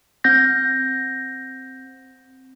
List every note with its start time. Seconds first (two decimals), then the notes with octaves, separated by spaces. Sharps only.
0.24 C4 G6 A#6